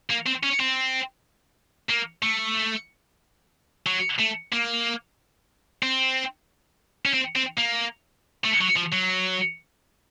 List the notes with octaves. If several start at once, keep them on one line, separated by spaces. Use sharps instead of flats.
A#3
C4
C#4
C4
A#3
A3
F#3
A3
A#3
C4
C#4
C4
C4
A#3
A3
F#3
F3
F#3